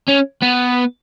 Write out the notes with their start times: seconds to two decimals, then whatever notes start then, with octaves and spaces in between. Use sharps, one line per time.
0.08 C#4
0.42 B3